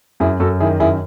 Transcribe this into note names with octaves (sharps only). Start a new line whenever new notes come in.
F#2 E4 G#4
F#2 F#4 A4
D#3 E4 G#4
F#2 E4 G#4